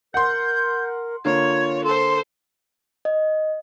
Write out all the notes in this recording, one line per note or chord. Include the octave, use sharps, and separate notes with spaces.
A#4 F#5 C6 G6
D3 A#3 F4 C#5 G#6
A4 C5 C6
D#5